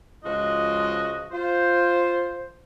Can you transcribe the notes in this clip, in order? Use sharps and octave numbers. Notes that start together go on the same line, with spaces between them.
C#2 F3 G#3 F4 F#4 D#5
F4 C5